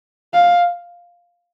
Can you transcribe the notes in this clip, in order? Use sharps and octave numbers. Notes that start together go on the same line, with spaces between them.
F5